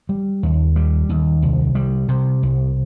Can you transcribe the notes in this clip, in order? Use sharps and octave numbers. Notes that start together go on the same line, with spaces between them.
G3
D#2
G3
D#2
C2
G3
C3
C2